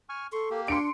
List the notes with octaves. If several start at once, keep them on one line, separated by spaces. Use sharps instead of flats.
G#5 C#6 F6
A4 C6 C#6
A#3 G4
D4 C6 C#7 D7